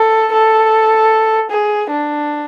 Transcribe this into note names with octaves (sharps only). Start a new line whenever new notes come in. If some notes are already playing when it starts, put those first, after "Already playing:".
Already playing: A4
A4
G#4
D4